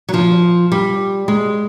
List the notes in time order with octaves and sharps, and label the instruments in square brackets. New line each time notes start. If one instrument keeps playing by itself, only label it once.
[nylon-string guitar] F#3
F3
G3
G#3